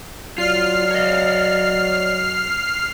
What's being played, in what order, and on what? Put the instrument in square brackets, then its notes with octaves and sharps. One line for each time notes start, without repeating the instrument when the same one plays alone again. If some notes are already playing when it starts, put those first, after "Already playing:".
[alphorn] F#3 [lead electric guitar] F4 [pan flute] D5 [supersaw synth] F6 C7
[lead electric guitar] C#5 D#5